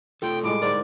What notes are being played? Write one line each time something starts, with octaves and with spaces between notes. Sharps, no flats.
A3 F4 A4 G5
A2 G3 G#3 D6
G#2 D3 A#4 C5 D5